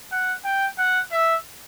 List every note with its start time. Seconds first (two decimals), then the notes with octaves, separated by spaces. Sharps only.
0.12 F#5
0.45 G5
0.78 F#5
1.12 E5